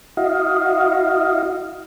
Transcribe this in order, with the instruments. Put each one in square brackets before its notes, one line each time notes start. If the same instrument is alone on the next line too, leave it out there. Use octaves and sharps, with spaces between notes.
[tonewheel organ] E4 F#4 D#5 F5